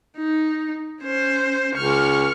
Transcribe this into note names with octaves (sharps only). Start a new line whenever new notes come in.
D#4
C#4 C5
C#2 C#6 F6